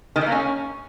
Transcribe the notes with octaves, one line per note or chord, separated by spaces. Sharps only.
D#3
E3
A#3
C#4